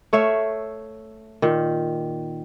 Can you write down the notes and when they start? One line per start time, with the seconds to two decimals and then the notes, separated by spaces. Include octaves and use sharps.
0.13 A3 C#5 E5 F5
1.42 A#2 D#3